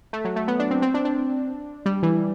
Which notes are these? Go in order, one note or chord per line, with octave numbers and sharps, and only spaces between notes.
A3
F#3
A3
B3
D4
C4
C4
D4
D4
G3
E3